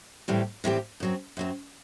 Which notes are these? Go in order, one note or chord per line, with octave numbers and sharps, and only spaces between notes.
A2 E3 G3 C4 G4
A2 E3 G3 C4 G4
F#2 F#3 C4
F#2 F#3 C4